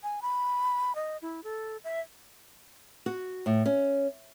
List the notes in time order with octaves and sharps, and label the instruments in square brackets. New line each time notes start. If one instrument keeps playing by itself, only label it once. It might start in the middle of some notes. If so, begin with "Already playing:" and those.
[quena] G#5
B5
D#5
E4
A4
E5
[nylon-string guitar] F#4
A2
C#4